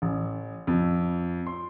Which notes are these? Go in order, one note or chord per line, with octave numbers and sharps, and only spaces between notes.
A1
F2
C6